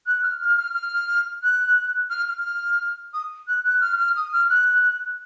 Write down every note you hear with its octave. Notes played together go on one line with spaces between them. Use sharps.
F#6
F6
F6
F6
F6
F#6
F6
F6
D#6
F#6
F#6
F6
F6
D#6
F6
F#6